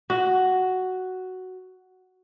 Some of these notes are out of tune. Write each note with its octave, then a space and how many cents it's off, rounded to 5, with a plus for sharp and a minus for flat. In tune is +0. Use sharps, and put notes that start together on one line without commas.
F#4 +5